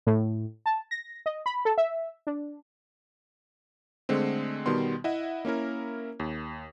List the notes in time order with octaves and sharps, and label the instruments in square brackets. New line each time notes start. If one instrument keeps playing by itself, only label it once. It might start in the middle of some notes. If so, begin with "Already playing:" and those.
[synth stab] A2
A5
A#6
D#5
B5
A4
E5
D4
[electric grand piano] D3 G#3 A3 C4
B2 D#3 G3 B3 C6
E4 D#5 E5 F#5
A#3 C#4 E4 A#4
D#2